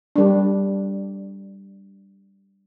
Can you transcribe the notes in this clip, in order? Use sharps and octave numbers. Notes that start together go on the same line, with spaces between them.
G3 D4